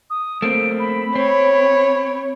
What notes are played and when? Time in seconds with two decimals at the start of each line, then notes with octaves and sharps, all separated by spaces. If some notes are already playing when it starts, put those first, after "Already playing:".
0.10 D#6
0.42 A3 A#3 C4 D7
0.80 B5
1.15 C4 C#5